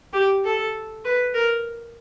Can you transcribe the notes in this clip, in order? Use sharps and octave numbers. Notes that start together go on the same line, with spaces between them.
G4
A4
B4
A#4